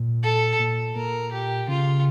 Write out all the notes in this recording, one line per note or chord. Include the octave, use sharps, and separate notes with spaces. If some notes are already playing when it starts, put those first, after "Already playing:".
Already playing: A#2
A4
A#2
A#2 A#4
G4
C#3 F4